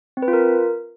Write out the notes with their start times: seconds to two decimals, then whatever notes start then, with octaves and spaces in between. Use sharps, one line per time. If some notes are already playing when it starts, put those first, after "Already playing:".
0.17 C4
0.22 B4
0.28 F4
0.33 A#4